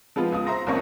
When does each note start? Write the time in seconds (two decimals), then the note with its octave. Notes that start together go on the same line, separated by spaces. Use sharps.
0.16 F3 G#3 B3 F4
0.32 C#2 D#6
0.47 C5 E5 A#5 C6 A#6
0.67 C2 F2 A#3 C4 C#4 C#6